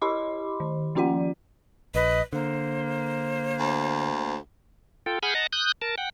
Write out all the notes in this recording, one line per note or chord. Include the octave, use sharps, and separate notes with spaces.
E4 G4 D#5 B5 C6 D6
D#3
F3 A#3 C#4 F4 D5 F#5
A#1 B4 D#5
D3 A#3 C5
D2
F4 A4 G5
G#4 F#5 G#5 B5 F6 G6
D#5 F#5 A5 A#5
D#6 F#6 G6
A#4 A5
F#5 G5